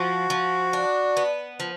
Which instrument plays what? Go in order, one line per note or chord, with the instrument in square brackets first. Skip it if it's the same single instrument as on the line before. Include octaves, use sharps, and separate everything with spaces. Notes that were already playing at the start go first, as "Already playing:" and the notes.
Already playing: [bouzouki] F3 [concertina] F#4
[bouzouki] F3
D4
B3
F3